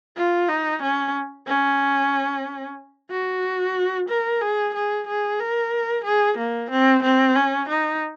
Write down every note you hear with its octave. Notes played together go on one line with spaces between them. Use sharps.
F4
D#4
C#4
C#4
F#4
A#4
G#4
G#4
G#4
A#4
G#4
A#3
C4
C4
C#4
D#4